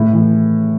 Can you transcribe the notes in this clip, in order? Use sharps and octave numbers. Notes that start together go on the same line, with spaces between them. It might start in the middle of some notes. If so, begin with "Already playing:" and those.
Already playing: A2
E3